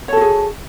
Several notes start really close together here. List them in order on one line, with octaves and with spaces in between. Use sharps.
C#5 A4 F#4 G#4